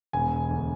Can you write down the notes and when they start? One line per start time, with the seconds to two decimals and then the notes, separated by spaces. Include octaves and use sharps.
0.13 E1 G#5
0.49 D2